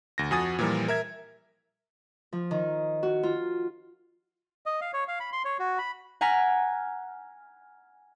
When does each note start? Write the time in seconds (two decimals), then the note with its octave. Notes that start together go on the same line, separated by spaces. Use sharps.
0.18 D2 A#6
0.31 F2 F#4 G#5 D#6 A6
0.59 A#2 E3 F3 G3 A#4
0.88 A#4 E5 G#6
2.33 F3
2.51 D#3
3.03 F#4
3.23 F4
4.66 D#5
4.81 F5
4.94 C#5
5.08 F5
5.20 B5
5.33 C6
5.45 C#5
5.59 F#4
5.78 B5
6.21 F#5 G#5 A#5 F6 B6